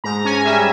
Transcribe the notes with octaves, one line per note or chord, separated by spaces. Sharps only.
G#2 A#5
C#4 G#5
G3 E5